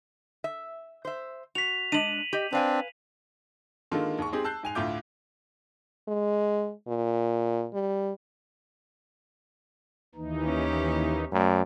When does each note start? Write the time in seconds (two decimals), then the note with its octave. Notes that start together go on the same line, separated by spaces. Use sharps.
0.44 E5
1.05 C5 E5
1.55 F#4 B6 F7
1.92 G#3 D4 D#7 F#7
2.33 G4 D#5
2.53 C4 D4 B4 F5 G#5
3.91 D3 D#3 G#3 A#3 F4 A4
4.19 D#2 G#3 C#6
4.32 G#3 C4 D#4 G4 G#4
4.44 A5 E6 F#6 G6 C7
4.63 G#2 G#5 F7
4.75 D2 A2 F4 E5 D6 G6
6.08 G#3
6.87 A#2
7.73 G3
10.15 D#2 E3 D#4
10.44 C#4 G4
11.32 F#2 A3 D5